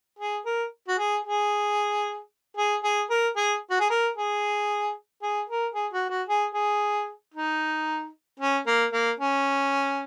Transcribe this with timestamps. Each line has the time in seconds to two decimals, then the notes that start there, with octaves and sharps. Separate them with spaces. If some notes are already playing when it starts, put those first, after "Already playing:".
0.19 G#4
0.46 A#4
0.88 F#4
0.98 G#4
1.25 G#4
2.57 G#4
2.84 G#4
3.10 A#4
3.36 G#4
3.70 F#4
3.80 G#4
3.90 A#4
4.17 G#4
5.22 G#4
5.49 A#4
5.74 G#4
5.93 F#4
6.10 F#4
6.27 G#4
6.54 G#4
7.34 D#4
8.40 C#4
8.66 A#3
8.93 A#3
9.19 C#4